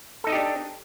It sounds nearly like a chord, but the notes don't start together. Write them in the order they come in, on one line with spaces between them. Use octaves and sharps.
A4 D#4 D#5 G4 D4